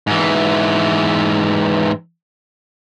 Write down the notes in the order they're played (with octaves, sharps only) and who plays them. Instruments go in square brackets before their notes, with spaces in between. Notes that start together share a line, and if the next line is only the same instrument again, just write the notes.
[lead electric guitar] G#2 E3